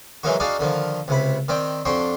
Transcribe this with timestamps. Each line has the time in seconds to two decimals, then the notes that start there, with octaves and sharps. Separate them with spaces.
0.23 E3 F#3 G#3 A#3 D#4 F#4
0.40 D4 D#4 F#4 G#4 D5 F5
0.59 D3 D#3 F3
1.08 C#2 C3 B5
1.48 D#3 C4 D5 G5
1.85 F2 D4 F#4 G5 C6